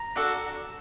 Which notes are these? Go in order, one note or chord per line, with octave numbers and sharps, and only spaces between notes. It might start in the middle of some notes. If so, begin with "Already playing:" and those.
Already playing: A#5
D4 F#4 A4